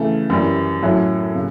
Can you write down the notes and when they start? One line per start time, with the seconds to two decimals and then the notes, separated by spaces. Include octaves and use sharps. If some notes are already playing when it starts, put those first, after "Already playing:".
Already playing: C#3 E3 A3
0.30 F#2 E3 G3
0.82 A2 F#3 C#4 E4
1.35 C#3